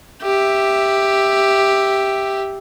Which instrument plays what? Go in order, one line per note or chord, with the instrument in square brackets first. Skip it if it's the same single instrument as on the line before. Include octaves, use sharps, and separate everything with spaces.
[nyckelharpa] G4 E5